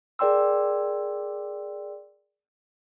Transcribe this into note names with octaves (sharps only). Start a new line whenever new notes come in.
G#4 A#4 D5 G5 C6 E6